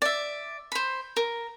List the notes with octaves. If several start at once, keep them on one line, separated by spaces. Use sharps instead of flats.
D5 E5
C5 B5
A#4